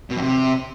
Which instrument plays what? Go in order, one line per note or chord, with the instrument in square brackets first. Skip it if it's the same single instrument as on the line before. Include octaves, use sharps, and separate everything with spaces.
[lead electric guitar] B2
F2
C3